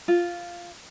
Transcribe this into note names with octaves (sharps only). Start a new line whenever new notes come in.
F4